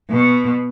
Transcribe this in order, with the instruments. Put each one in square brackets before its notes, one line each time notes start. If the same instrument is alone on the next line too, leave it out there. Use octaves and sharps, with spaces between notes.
[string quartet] B2